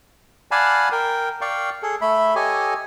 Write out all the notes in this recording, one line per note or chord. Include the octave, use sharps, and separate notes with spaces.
D5 F5 F#5 G#5 A5 B5
A#4 G5
D5 F5 G5 C#6
G#4 A4
A3 E5 B5
G4 A4 C#5 D#5 G#5